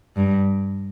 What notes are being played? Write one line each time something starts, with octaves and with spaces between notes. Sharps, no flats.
G2